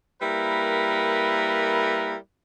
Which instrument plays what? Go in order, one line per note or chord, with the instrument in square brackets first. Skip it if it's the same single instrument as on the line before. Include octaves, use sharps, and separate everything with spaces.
[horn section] G3 A#3 E4 A#4 B4